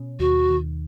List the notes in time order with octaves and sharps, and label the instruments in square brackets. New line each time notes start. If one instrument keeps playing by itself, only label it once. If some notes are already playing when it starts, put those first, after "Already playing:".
Already playing: [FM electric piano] B2 C#4
[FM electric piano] D#2 [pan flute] F#4
[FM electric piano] D#3